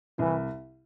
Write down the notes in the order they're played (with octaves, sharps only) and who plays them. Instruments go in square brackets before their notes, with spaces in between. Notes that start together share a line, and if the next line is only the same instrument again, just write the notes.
[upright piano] C2 [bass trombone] E3